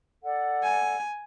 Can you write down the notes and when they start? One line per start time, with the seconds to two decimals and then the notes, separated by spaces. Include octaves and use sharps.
0.23 A4 D5 F#5
0.63 G#5